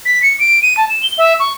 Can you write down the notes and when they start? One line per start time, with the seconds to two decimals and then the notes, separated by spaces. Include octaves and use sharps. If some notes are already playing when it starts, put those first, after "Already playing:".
0.06 B6
0.22 C#7
0.40 D7
0.62 D#7
0.77 A5
0.90 E7
1.03 G7
1.18 E5
1.40 C#6